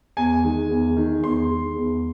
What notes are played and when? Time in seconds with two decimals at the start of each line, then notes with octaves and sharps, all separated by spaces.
0.17 E2 G#5
0.43 D#3 G#3
0.70 E2
0.97 D#3 G#3
1.23 E2 C6
1.50 D#3 G#3
1.77 E2